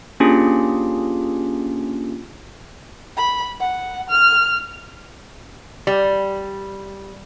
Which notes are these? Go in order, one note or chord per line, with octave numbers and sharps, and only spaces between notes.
A#3 C#4 D4 F4 G4 G#4
B5
F#5
F6
G3